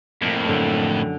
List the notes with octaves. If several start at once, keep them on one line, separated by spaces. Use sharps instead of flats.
F2 A2 A#3
F#2 D3